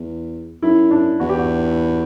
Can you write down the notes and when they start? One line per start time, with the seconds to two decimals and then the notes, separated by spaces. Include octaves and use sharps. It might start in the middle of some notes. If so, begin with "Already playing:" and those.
Already playing: E2
0.62 F#2 E4
0.91 D4
1.20 E2 F#4
1.29 G4
1.38 F#4